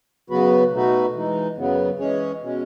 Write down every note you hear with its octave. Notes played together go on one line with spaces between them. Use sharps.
C#3 F#3 B3 F#4 B4
B2 A3 D#4 F#4 B4
E3 G#3 D#4
F#2 C#3 F#3 B3
E3 G#3 C#4 G#4 C#5
B2 G#3 C#4